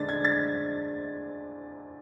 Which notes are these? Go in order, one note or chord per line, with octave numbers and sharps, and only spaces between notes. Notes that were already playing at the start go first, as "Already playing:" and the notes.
Already playing: D3 G#3 D4 A6
G#6
A6